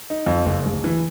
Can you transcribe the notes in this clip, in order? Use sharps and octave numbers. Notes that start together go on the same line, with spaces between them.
D#4
F2
F#1
D1
E3